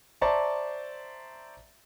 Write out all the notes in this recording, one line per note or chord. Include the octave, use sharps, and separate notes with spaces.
C5 D5 E5 A5 A#5 C#6